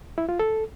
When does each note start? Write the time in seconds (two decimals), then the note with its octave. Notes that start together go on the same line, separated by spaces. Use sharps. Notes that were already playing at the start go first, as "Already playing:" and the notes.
0.18 E4
0.29 F4
0.39 A4